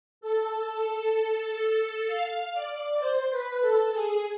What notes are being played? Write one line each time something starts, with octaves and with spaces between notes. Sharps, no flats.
A4
F5
D5
C5
B4
A4
G#4